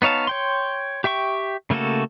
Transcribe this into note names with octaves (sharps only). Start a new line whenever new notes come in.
B3 D#4 C#5 F5 A5
C#5 G5 C6
G4 E5 G5 C#6
C#3 A3 A#3 F#4 A4